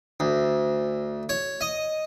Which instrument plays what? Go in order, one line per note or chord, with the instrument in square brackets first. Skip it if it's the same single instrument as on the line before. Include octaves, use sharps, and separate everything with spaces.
[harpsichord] D2
C#5
D#5